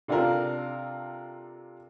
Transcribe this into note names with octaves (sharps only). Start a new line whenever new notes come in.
C3 D4 F4 A4 A#4